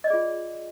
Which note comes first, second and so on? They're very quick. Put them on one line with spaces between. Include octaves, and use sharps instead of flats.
D#5 D5 G#4 F4